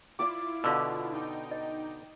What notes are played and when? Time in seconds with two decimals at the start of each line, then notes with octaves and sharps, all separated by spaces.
0.19 E4 F4 D5 D6
0.64 B2 D3 F5 E6
1.12 D#4 G5
1.51 D#5